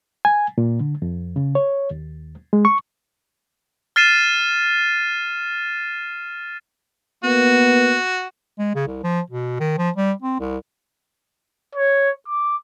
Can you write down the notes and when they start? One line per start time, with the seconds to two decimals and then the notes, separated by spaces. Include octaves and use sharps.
0.25 G#5
0.58 A#2
0.80 D3
1.02 F2
1.36 C#3
1.55 C#5
1.91 D#2
2.53 G#3
2.65 C#6
3.96 F6 A6 C7 D#7 E7
7.24 A#3 B3 F#4
8.59 G#3
8.75 C#3
8.87 C2
9.04 F3
9.30 B2
9.60 D#3
9.78 F3
9.97 G3
10.22 C4
10.40 C2
11.75 C#5
12.28 D6